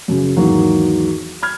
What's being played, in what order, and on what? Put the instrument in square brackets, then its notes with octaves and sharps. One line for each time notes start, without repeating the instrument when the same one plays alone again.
[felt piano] F#2 C#3
E2 G#2 D#3 E3 F#3 A#3
B5 F6 G#6